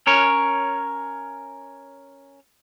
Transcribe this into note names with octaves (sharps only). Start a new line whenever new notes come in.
C#4 A#4 C#5